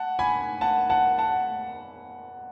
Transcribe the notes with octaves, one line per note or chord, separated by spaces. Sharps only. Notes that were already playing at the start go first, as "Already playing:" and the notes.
Already playing: F#5 A5
G#5 B5
F#5 A5
F#5 A5
F#5 A5